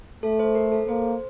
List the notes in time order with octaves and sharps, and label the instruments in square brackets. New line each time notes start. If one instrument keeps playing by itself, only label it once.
[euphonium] A3 [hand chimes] A4
[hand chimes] C5
A#4
A4
[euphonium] A#3 [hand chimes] C5